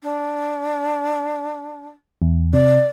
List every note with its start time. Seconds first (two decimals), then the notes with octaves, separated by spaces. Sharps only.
0.03 D4
2.22 E2
2.53 C3 D5